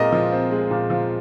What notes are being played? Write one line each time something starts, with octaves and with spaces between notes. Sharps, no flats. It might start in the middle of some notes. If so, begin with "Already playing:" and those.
Already playing: A#2 G#3 C4 A#4 D#5
F3
C4
G#3
A#2
F3